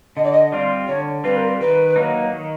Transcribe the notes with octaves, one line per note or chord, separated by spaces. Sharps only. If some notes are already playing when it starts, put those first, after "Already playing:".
D3 D#5
D5
D#5
G3 C4 F4 D5
D3 C#5
G3 C4 F4 B4
A#4
B4
D#3 B4
F#3 A#3 D#4
D#3